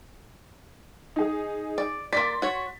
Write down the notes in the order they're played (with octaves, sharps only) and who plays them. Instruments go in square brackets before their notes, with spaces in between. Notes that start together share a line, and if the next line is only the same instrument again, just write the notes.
[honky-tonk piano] D#4 G#4
[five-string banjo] D5
[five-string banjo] A#3 D5 [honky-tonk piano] C6 A6 B6
[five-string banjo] F#4 C#5